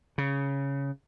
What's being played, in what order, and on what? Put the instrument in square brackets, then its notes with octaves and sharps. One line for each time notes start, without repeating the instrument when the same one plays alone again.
[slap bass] C#3